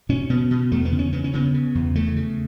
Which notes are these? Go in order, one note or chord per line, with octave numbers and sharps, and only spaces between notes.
B2 C#4
B2 B3
B2
E2 A3
B3
C#3
C#4
C#3 B3
C#4
C#3 B3
C#3
E2
C#3 A3
C#3